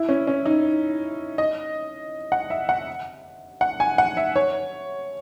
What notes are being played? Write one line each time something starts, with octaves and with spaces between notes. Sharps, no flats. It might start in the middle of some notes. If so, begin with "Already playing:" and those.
Already playing: E4
C#4
C#4
D#4
D#5
F#5
E5
F#5
F#5
G#5
F#5
E5
C#5